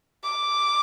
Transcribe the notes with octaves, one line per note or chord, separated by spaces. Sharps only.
D6